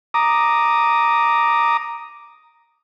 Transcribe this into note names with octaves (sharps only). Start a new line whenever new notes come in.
A#5 D6 D#6